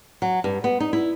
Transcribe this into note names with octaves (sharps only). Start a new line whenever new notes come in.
F#3
G2
B3
D#4
E4